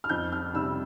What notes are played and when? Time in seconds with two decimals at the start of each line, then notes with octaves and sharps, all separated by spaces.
0.04 F6
0.09 F2 G6
0.32 F6
0.54 C3 G3 E6